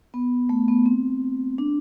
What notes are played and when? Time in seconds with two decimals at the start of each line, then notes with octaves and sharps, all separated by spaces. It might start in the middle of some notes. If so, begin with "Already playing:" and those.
0.14 B3
0.49 A3
0.68 B3
0.86 C4
1.58 D4